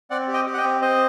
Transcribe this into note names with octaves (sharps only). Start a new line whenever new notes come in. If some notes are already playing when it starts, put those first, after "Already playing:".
C4 D5 F#5
G4
D#5 G5
G4
F#5
D#5 G5
C4
C4 C5 D#5